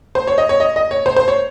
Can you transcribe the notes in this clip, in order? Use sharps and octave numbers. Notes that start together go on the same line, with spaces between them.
C5
C#5
D#5
C#5
D#5
D#5
C#5
C5
C5
C#5